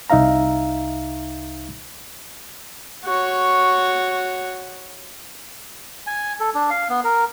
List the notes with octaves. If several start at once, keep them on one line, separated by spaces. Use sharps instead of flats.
C2 D#4 E5 F5 A#5
F#4 C#5
G#5
A4
D4
F5
B3
A#4